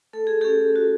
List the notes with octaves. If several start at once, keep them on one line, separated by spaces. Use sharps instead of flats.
A3 A4
G#4
C#4 G4 A4
F#4